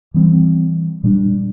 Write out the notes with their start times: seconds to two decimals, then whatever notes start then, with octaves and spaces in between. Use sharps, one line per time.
0.14 E3 G3 C4
1.03 A#2 G3 D4